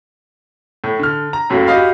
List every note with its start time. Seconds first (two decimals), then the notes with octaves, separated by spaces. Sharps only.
0.84 A2
0.99 D3 F6
1.33 A#5
1.50 F#2 A2 F#3 A#3
1.67 F#4 G4 D#5 F5 B5